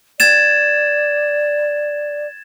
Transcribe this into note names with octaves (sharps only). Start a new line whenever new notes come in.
D5 G#6 A6 E7